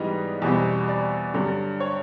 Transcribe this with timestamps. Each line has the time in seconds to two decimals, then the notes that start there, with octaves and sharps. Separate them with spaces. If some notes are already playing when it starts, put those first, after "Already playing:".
Already playing: G#2 E3 G3 B3 D#5
0.42 E2 B2 G3 C4
0.88 D5
1.34 G2 D3 F#3
1.80 C#5